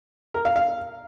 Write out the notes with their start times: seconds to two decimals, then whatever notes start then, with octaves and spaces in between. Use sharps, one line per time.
0.34 A#4
0.45 F5
0.56 F5